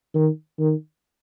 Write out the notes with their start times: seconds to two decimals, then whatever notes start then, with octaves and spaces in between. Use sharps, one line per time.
0.15 D#3
0.60 D#3